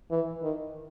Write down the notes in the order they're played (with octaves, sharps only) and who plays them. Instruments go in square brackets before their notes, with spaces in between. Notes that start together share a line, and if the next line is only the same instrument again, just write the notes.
[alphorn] E3
D#3